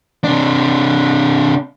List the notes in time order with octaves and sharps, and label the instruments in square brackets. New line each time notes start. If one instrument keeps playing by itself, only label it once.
[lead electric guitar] C3 D4